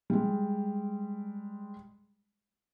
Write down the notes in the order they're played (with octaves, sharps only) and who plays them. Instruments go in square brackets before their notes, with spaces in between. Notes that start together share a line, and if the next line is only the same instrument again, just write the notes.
[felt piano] G3 G#3